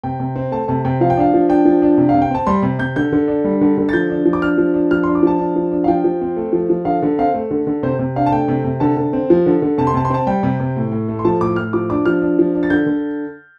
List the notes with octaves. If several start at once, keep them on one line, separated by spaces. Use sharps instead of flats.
C3 G5
C3
C4
A3 A5
C3 A5
C3 G5
F3 F5
G5
D4 F5
F3
D4 G5
F3
D4
C3
F5
C3
G5
C4 A5
G3 C6
C3
C3 G6
D3 G6
D3
D4
G3
D3
D3
A6
F3 G6
D4
F3
D6
D4 F6
F3
D4
F3 F6
C6
D4
D6
F3 A5
D4
F3
D4
F5
F3 G5
F3
C4
A3
F3
F3
D3 F5
D3
C4 F5
A3
D3
D3
C3 C5
C3
D4 F5
A5
A3 G5
C3
C3
D3 A5
D3
C4
F3
D3
D3
C3 A5
C6
C3 A5
C6
C4 A5
G3 G5
C3
C3
A2
A2
A3
C6
F3 A5
A2 D6
A2 F6
F3 D6
D4 D6
F3 F6
D4
F3
D4
A6
D3 G6
D3